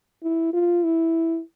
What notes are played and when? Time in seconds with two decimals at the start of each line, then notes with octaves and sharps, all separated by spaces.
0.23 E4
0.53 F4
0.84 E4